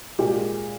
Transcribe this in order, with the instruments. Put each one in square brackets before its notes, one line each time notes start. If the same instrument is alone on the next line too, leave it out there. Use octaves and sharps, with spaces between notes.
[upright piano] A#2 G#3 G4